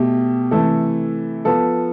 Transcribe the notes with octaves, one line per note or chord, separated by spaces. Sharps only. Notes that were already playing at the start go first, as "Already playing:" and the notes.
Already playing: B2 A3 G4
C3 E3 A3 E4 A4
F3 B3 F4 A4